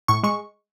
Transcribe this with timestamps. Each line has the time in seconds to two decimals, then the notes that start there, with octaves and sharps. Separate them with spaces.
0.08 A2 C#6
0.23 G#3 C#6